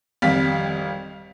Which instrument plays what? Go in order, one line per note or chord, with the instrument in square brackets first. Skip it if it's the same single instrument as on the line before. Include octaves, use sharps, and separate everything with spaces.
[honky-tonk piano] G#1 F2 G3 F5 B6